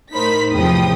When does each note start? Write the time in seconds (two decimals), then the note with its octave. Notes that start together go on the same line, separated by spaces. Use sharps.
0.13 A2 D#4 A#4 C5 B5 B6
0.52 E2 A2 C3 F3 G5 D#6